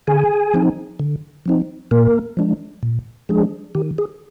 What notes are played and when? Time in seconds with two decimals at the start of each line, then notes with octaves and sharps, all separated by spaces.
0.07 D3 G#4 G#5
0.54 F3 C4 D#4
0.99 D3
1.46 F3 C4 D#4
1.91 A#2 A#3 A#4
2.37 F3 G#3 D4
2.83 A#2
3.29 F3 G#3 D4 G#4
3.75 D#3 G4
3.98 G#4